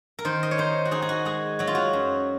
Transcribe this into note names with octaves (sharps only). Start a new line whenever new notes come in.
A#4
D#3 C5
D#5
C#5
D#4 C5
F#4
D#4 G#4
G#4
F#4
G#3 G#4
F#3 F#4
F4
F#4
F#2